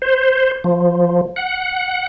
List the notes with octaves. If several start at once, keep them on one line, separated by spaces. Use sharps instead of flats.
C5
F3
F#5